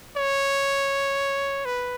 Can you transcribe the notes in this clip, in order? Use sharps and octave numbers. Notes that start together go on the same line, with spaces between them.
C#5
B4